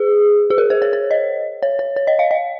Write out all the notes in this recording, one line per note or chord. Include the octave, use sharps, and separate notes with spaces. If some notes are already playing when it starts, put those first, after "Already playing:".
Already playing: G#4
G#4
A#4
C5
C#5
C#5
D#5
C#5
C#5
C#5
D#5
F5
D#5